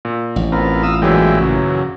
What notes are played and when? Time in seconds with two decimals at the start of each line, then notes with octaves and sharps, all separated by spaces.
0.05 A#2
0.36 A1
0.52 B3 C4 F4 A#4
0.83 F4 F5 D#6 E6
1.02 A#2 E3 F#3 G#3 E4 G4
1.41 F#2 C#3